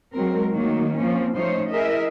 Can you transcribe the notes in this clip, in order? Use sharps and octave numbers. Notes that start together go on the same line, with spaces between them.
F#3 G#3 C4 A#4
D#3 F#3 A3 A#3
F3 A#3 C4 C#4
F3 A3 C#4 D#4 C5 C#5
E4 G#4 A#4 D#5 E5